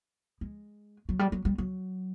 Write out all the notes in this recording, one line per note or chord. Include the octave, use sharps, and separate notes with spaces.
G#3
F#3
G3
F#3
G3
F#3